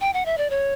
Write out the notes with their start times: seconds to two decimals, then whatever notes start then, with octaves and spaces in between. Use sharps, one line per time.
0.00 G5
0.14 F#5
0.26 E5
0.38 D5
0.50 C#5